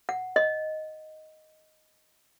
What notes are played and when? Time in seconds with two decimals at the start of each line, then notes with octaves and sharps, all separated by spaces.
0.09 F#5
0.36 D#5